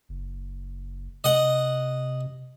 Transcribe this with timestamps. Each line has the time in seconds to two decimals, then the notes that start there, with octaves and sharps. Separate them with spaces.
0.09 F#1
1.24 C3 D#5 F#5